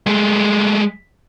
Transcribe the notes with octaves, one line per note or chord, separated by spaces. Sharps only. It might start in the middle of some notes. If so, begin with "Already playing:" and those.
G#3 A3